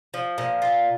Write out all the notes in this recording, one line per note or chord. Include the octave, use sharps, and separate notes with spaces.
F3
A#2
F4